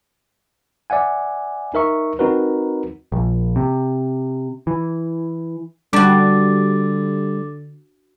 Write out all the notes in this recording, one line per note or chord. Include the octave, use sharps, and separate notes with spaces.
D5 E5 F#5 G#5
D#4 A#4 E5 C#6
C4 D#4 F#4 A#4 B4
A#1
C3
E3
D3 G3 D4 F#4 D6 A6